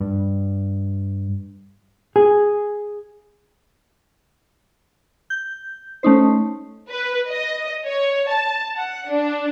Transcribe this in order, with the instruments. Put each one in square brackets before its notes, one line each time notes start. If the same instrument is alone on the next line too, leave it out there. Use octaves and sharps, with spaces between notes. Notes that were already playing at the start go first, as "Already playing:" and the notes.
[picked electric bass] G2
[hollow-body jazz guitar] G#4
[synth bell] G6
A3 C#4 D#4 C5
[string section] B4
D#5
C#5
A5
F#5
D4